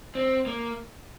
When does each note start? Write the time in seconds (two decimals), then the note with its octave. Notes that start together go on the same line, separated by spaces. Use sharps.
0.15 C4
0.46 A#3